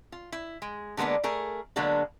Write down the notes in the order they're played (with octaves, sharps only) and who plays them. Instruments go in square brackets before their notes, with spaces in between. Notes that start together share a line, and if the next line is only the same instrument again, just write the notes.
[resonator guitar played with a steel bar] F4
E4
G#3
D3 G#3 A#3 B3 D4
A3 G#4 A#4
D3 F#3 G#3 A#3 B3 D4